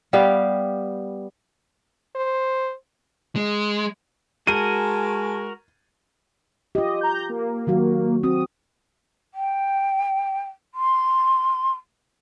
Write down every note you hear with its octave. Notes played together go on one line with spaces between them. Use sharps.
G3 B3 G4 F5
C5
G#3
G#3 F#4 A#4 G#5 A5 C#6 D#7
F4 G4 D#5
A#5 G6
A#3
D#3 F#3 F#4
C4 F#4 D#6
G5
C6